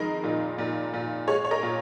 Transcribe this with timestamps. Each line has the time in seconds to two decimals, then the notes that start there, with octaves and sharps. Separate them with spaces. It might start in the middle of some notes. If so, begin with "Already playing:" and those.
Already playing: F2 D#3 G#3 A#4 D#5
0.24 A#2
0.58 A#2
0.93 A#2
1.27 G#3 G#4 C#5
1.45 C#5
1.51 A#4 D#5
1.63 A#2